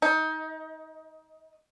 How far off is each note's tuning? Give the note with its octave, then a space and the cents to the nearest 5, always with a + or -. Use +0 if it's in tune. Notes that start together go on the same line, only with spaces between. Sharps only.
D#4 +25